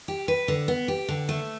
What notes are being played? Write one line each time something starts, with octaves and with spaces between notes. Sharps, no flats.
G4
B4
D3
B3
G4
D3
A3